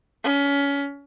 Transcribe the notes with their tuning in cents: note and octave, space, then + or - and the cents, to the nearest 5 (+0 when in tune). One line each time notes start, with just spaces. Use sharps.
C#4 +25